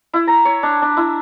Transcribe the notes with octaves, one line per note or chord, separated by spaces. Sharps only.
E4
A#5
C#5
D4
D4
E4